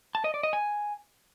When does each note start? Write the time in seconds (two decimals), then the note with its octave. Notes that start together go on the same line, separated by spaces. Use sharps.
0.15 A5
0.24 D#5
0.34 D5
0.43 D#5
0.53 G#5